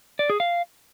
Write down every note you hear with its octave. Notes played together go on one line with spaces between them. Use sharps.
D5
G#4
F5